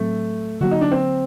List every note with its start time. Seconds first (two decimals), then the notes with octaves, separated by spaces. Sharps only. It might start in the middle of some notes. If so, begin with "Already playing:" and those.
Already playing: A2 F#3 A3 C4
0.61 D3 F#3 A#3 F#4
0.71 D#4
0.81 D4
0.92 C4